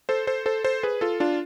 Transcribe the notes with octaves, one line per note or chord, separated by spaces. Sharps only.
A4 C5
A4 C5
A4 C5
A4 C5
G#4 B4
F4 A4
D4 F4